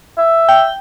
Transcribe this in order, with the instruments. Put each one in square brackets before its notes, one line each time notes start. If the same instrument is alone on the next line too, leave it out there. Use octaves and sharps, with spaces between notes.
[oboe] E5
[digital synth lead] G5